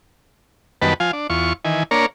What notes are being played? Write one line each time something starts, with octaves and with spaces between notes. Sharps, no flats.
F#2 D#3 G3 B3 B4 A5
F3 F4 F5 G#5
D4
E2 F4 C#6
D#3 E3 G#5
A#3 D4 A#4 C#5